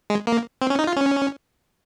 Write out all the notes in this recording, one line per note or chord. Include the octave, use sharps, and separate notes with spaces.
G#3
A#3
C4
C#4
D#4
F4
C#4